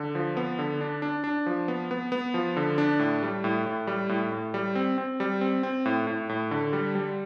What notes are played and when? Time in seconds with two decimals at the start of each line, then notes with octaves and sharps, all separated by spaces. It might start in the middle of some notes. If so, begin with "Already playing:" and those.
Already playing: D3
0.15 F3
0.37 B3
0.59 D3
0.81 D4
1.02 D4
1.24 D4
1.46 F3
1.68 B3
1.91 B3
2.12 B3
2.34 F3
2.57 D3
2.78 D4
2.99 A2
3.23 G3
3.44 A2
3.66 A2
3.87 G3
4.09 A2
4.32 A2
4.54 G3
4.75 C4
4.98 C4
5.20 G3
5.41 C4
5.63 C4
5.86 A2
6.07 A2
6.29 A2
6.51 D3
6.73 G3
6.95 G3